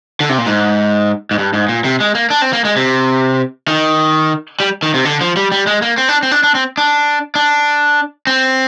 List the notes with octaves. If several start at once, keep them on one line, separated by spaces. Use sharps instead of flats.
D3
C3
A#2
G#2
G#2
G2
G#2
A#2
C3
G#3
A#3
D4
C4
A#3
G#3
C3
D#3
G3
D#3
C3
D3
F3
G3
G3
G#3
A#3
C4
D4
C4
D4
D4
C4
D4
D4
C4